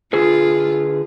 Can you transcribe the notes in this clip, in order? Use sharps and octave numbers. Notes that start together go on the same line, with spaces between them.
D3 F4 G#4 B4